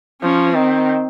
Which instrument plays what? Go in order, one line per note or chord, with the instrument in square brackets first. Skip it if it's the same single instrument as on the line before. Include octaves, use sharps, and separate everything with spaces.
[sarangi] F3 [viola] C#4
[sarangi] D#3 [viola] C4